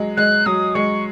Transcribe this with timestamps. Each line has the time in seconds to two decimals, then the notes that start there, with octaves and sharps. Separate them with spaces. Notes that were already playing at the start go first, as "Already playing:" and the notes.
Already playing: F#3 G#3
0.17 G#3 F#6
0.46 F#3 D#6
0.75 G#3 C#6